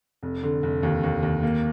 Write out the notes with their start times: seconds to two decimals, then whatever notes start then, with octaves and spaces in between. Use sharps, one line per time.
0.23 F1
0.43 D3
0.63 F1
0.83 D#2
1.03 D#2
1.23 D#2
1.43 A#3